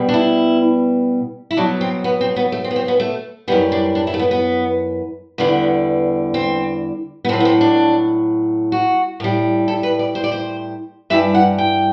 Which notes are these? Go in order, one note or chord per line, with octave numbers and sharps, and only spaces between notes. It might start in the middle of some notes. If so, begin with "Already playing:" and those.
Already playing: B2 G3
D4
E4
E4
B2 F#3 D4
C4
B3
C4
B3
A3
C4
B3
C4
B3
A3
F#2 E3 G3 B3
D4
D4
E4
A3
B3
B3
E2 D3 G3 B3
C4
B3
A2 F#3 C4
B3
C4
D4
F#4
A2 G3
A4
B4
D5
C5
D5
C5
G2 E3 G3 E5
F#5
G5